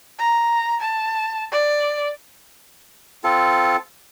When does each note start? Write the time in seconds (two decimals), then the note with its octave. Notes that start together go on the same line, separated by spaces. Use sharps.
0.19 A#5
0.80 A5
1.51 D5
3.24 C4 F4 A4